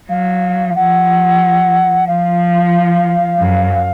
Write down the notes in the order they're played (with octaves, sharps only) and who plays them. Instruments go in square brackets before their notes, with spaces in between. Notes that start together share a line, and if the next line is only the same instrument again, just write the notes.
[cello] F#3 [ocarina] F5
[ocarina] F5
[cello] F3 [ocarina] F#5
[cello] F3 [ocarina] F5
[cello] F#2